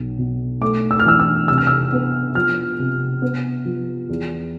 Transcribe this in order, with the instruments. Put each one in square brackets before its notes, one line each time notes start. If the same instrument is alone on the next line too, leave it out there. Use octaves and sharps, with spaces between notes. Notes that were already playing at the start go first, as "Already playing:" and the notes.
Already playing: [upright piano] B1
B2
A3 D6
E6
F6
E3 E6
E6
C3 E6
F6
E6
B3
F3 F6
C3
B3
F3
E2